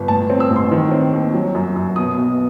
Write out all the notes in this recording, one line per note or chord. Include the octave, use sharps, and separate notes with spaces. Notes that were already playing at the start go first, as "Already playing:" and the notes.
Already playing: G1
A2 A5
C4
E6
A1
C6
D#3
C4
D#2
F#3
F#2
F#2
B2 D#6
B1